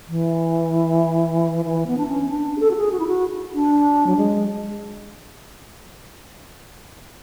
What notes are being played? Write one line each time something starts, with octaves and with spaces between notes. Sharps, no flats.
E3
E3
B3
D4
C#4
D4
G#4
A4
F#4
G#4
F#4
E4
F#4
D4
F#3
G#3